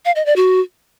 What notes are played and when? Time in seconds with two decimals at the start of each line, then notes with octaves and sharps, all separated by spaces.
0.05 F5
0.16 D#5
0.26 D5
0.36 F#4